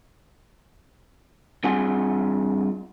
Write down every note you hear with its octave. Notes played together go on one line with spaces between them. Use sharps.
G2 C4 F4 G#4 F#5 G#5